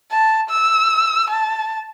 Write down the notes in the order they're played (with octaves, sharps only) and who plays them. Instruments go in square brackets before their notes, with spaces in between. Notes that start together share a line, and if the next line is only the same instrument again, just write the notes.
[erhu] A5
E6
A5